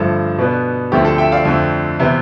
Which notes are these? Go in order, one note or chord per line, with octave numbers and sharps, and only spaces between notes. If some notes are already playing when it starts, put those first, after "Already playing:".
Already playing: G2 D3 F3 A3 A4
B2 B3 D4
D2 D3 F3 A3 C4 G4
A4
E5 G5
D5 F5
F2 D3 A3 C4
C3 E3 B3